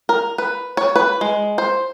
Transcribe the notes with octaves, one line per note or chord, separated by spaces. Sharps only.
A#4
B4
C#5
B4
G#3
C5